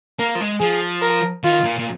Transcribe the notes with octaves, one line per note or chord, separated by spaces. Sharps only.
A#3 A#4
F3
G#3
F3 G#4
A#4
D#3 F4
A#2
A#2